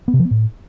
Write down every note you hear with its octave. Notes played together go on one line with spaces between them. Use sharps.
B3
C3
F3
B3
A2